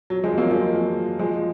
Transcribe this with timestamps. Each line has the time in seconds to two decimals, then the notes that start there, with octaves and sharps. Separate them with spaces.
0.10 F#3
0.24 F3 G#3
0.37 F#3 A#3
0.51 F3 G#3
1.19 F3 G#3